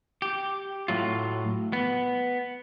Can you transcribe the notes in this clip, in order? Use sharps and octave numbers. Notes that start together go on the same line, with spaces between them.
G4
A2 F#3 F4
B3